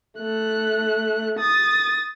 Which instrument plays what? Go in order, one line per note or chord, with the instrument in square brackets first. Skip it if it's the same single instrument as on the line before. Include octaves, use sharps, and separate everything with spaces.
[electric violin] A3 F#6
D#6 A6